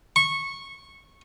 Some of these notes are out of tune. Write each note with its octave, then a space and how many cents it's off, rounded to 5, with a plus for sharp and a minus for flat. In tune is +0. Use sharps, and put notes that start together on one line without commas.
C#6 -15